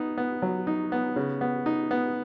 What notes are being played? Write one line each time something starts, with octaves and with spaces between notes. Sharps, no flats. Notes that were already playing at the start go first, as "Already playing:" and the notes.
Already playing: B3 D#4
B3
F#3
D#4
B3
C#3
B3
D#4
B3